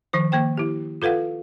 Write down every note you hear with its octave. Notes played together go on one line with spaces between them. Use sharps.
D#3 F3 C5
D#3 A#3 C5 G5
E4 G4
F4 A4 B4 F5 F#5